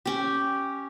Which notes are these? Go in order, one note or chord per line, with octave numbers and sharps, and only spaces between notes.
C#4 G4